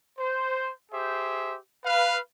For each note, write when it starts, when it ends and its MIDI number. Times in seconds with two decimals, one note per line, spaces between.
0.18 0.70 72
0.92 1.56 67
0.92 1.56 68
0.92 1.56 72
0.92 1.56 76
1.85 2.18 71
1.85 2.18 77